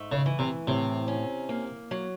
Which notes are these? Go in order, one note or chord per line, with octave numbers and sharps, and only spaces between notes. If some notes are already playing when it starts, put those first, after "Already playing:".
Already playing: G#2 A3
C#3
E3
C3
A2 C3
C#4
A#3
F#3